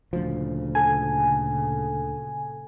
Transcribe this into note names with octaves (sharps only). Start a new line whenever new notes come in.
D2 A#2 C#3 F3
A4 G#5